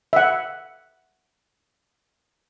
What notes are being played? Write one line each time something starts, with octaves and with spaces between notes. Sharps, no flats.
E5 F#5